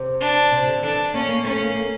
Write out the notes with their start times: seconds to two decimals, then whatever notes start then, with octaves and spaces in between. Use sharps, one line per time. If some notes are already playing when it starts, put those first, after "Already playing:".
Already playing: C3
0.21 D4
0.52 C3
0.67 D3
0.83 E3 D4
1.14 A#3 C#4
1.29 A#3
1.45 A3 C#4
1.61 A#3
1.75 A#3